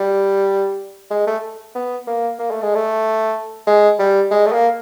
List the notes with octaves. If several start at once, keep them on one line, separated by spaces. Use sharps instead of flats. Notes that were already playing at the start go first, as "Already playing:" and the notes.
Already playing: G3
G#3
A3
B3
A#3
A#3
A3
G#3
A3
G#3
G3
G#3
A3
A#3